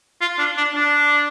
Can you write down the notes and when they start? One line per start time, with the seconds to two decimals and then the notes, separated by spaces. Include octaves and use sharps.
0.21 F4
0.39 D4
0.57 D4
0.75 D4